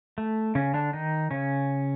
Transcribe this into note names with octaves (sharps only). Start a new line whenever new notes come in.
A3
C#3 C#4
D3 D4
D#3 D#4
C#3 C#4